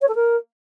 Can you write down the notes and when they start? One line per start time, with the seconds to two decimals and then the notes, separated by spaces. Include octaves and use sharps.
0.01 C#5
0.08 A4
0.14 A#4